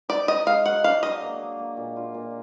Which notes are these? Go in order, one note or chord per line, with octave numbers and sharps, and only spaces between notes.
D#4 D5
D#4 D#5
G#3 F5
F#3 F#5
D4 F5
F#3 D#5
A#3
A#3
A#3
A#2
F4
A#2